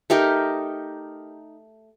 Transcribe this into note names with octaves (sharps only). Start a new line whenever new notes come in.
A3 D#4 G4 A#4